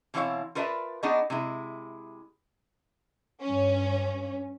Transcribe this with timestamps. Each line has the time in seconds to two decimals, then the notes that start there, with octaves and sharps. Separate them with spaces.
0.14 B2 E3 C4 E4 C#5 F5
0.55 F4 A#4 B4 D5 E5 A5
1.03 B3 D4 D#4 F#4 G#4 D#5
1.30 C3 G#3 E4
3.42 G2 C#4